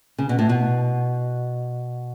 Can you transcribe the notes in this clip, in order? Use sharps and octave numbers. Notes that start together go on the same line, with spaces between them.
C#3
B2
A2
B2